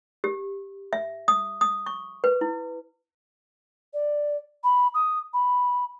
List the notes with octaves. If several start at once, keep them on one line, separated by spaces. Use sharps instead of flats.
G4
E5
D#6
D#6
C#6
B4
E4
D5
B5
D#6
B5